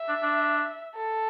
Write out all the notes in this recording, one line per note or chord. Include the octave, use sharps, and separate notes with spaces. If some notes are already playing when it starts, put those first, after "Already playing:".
Already playing: E5
D4
D4
A4